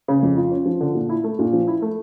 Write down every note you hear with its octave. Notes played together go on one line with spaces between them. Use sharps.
C#3
F2
F4
C#4
F3
D3
A#2
E4
A3
A#2
F3
E4
A3